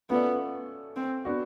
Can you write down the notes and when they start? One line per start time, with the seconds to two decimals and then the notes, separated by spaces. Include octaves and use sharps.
0.10 A3 B3 C#4 F4 A4 D5
0.96 C4
1.25 B3 D4 F#4